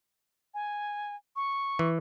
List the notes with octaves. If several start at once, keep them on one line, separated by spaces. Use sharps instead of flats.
G#5
C#6
E3